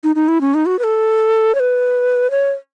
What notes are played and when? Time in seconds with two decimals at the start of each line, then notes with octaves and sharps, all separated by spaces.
0.04 D#4
0.15 D#4
0.28 E4
0.41 C#4
0.54 D#4
0.66 F#4
0.79 B4
0.84 A4
1.55 C#5
1.60 B4
2.31 C#5